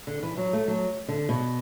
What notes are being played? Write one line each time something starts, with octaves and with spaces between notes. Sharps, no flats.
D3
E3
F#3
A3
F#3
D3
B2